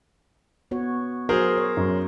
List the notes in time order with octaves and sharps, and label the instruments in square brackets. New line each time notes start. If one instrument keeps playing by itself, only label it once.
[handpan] B3 F#4 C#5
[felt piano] F#3 [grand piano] G#4 A#4 C5
[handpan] C#5
[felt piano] F#2